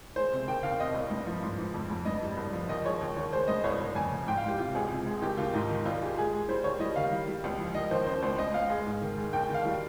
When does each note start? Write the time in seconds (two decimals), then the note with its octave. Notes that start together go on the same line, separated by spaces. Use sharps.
0.16 G#3 C5
0.32 C3
0.48 D#2 G5
0.63 D#2 F5
0.79 C3 D#5
0.95 C2
1.10 G2
1.26 F3
1.43 G#2
1.59 G#2
1.74 F2
1.90 F2
2.05 G2 D#5
2.22 G3
2.37 C2
2.53 F3
2.69 D#2 D#5
2.85 G#3 C#5
3.01 D#2
3.17 D#3 C#5
3.32 G#3 C5
3.48 G2 D#5
3.64 C2 C#5
3.80 C2
3.95 F2 G#5
4.12 F2
4.27 G#2 G5
4.38 F5
4.44 G#2 G4
4.58 C3 F4
4.75 C#2 G#4
4.90 C3
5.06 G#3
5.22 D#2 G4
5.37 D#2 F4
5.54 G#2 D#4
5.70 D#3
5.85 C2 F4
6.02 G#3 G4
6.17 G#3 G#4
6.33 G#3
6.48 G3 C5
6.64 D#2 C#5
6.80 G3 D#5
6.96 D#3 F5
7.12 G3
7.28 G3
7.44 C#2
7.59 F3
7.75 D#3 D#5
7.91 D#2 C5
8.07 C#3 C5
8.22 C#2 C5
8.38 C#2 D#5
8.54 C#2 F5
8.70 G#3
8.86 G#2
9.01 D#3
9.18 G#3
9.33 D#2 G5
9.43 G5
9.49 D#3
9.54 F5
9.65 G3